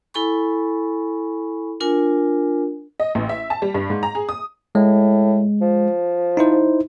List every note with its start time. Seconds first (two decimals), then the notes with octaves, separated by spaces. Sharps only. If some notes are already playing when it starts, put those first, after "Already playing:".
0.14 E4 A4 G#5 B5 C#6
1.80 D4 F4 A#4 G#5
3.00 D#5
3.15 A1
3.29 E5
3.50 A5
3.62 G3
3.74 G2
3.90 G#2
4.03 A#5
4.15 G#4
4.29 D#6
4.75 A2 G#3
5.61 F3
6.37 D#4 E4 C5